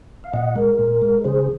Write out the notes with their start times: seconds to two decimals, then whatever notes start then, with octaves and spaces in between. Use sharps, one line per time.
0.24 F5
0.33 A#2 D#5 F#5
0.55 G#3 A#4
0.79 A#2
1.02 G#3
1.24 C#3 G#4 C5